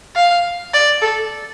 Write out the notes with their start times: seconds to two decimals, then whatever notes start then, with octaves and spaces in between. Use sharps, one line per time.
0.16 F5
0.74 D5
1.02 A4